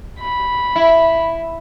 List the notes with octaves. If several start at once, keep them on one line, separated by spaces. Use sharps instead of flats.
B5
E4